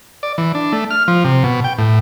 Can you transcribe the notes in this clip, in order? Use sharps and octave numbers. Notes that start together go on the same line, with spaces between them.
D5
E3
D4
A3
F6
F3
C3
B2
G5
A2